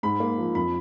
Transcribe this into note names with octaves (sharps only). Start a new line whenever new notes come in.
G#2 B5
A#3
F3
F2 B5